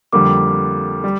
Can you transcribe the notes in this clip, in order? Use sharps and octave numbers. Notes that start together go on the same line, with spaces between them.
F2 D3 G3 A#3 D6
G3